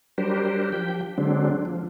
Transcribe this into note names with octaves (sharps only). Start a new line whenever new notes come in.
F#3 G3 D4 G4 A#4 C5
F3 G4 G5
D3 F#3 G#3 C4 D4
F3